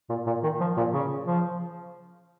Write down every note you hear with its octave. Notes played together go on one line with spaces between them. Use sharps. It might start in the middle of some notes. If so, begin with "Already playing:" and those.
A#2
A#2
D#3
F3
A#2
C#3
F3